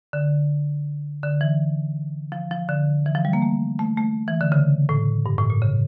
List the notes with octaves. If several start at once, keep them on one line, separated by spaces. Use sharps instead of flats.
D3
D3
E3
F3
F3
D3
E3
F3
G3
A#3
A3
A3
A3
E3
D3
C#3
A2
G2
A2
A#2
C#3